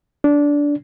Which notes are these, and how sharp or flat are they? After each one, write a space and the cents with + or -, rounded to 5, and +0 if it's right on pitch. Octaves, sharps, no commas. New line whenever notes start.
D4 -15